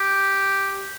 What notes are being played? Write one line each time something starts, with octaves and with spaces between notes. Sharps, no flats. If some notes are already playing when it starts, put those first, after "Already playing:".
Already playing: G4